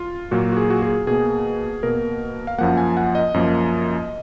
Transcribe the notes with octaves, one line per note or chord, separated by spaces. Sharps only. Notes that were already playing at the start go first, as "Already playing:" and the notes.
Already playing: F4
A#2 F#3 A#3 F#4
F#4
G#4
F#4
G#4
B2 A#3 G#4
B2 A#3 A#4
F5
F#2 F3 A#3 F#5
G#5
F#5
D#5
F#2 F3 A#3